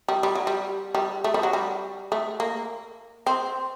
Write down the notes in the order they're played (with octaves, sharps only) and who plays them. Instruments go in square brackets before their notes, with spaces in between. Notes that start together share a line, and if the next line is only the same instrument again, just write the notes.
[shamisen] G3
G3
F#3
G3
G3
A3
G3
F#3
G3
A3
A#3
C4